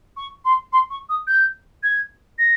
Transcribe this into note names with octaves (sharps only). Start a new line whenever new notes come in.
C#6
C6
C6
C#6
D#6
G6
G#6
A#6